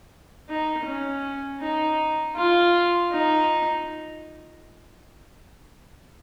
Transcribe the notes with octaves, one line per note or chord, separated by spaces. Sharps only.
D#4
C#4
D#4
F4
D#4